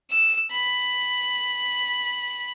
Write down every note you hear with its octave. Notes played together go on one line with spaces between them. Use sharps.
E6
B5